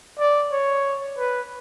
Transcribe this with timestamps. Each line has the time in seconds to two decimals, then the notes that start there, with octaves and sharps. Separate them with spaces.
0.19 D5
0.52 C#5
1.18 B4